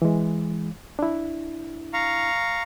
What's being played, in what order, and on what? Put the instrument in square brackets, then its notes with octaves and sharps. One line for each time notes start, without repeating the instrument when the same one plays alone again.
[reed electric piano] E3 G#3
D4 E4
[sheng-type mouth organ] F5 A#5 C#6